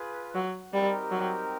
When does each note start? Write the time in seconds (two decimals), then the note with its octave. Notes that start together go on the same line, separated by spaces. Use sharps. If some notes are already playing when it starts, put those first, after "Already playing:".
Already playing: F4 G#4 B4
0.35 F#3
0.73 G3 C4 D#4 G4 A#4
1.11 F#3